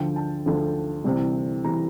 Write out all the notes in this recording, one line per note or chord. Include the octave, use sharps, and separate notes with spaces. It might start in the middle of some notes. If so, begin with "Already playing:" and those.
Already playing: D2 D3 F3 G5
A5
D2 D3 F3
C2 C3 E3
C3 E3 A#5